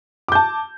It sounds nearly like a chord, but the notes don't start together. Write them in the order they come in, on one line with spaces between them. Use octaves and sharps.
D6 G6 A5